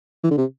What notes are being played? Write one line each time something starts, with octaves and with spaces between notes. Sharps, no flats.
E3
D3
C3